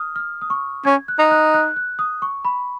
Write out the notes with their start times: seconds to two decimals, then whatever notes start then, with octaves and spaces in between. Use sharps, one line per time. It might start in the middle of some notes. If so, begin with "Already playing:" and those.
Already playing: D#6 F6
0.16 F6
0.42 D#6
0.50 C#6
0.85 C#4 G#6
1.08 F#6
1.19 D#4
1.31 F#6
1.54 F#6
1.76 F#6
1.99 D#6
2.22 C#6
2.45 B5